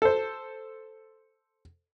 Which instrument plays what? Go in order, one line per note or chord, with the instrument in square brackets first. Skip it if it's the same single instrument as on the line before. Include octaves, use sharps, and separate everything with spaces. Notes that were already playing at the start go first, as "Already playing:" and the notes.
[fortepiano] A4 C5